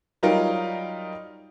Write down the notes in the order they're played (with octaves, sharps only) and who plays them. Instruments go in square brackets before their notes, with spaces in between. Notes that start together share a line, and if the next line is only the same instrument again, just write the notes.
[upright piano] F#3 G3 D#4 F4 A#4